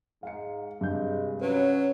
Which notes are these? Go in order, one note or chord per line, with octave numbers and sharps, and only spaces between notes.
G#2 F5 C#7
G2 C3 G#3 G6
F#3 C#4 B4